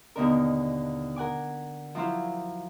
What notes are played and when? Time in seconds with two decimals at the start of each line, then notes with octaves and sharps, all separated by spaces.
0.16 D#2 B2 D3 A#4
1.16 A#4 F#5 G#5 D6
1.95 F3 F#3 E4 C5 F5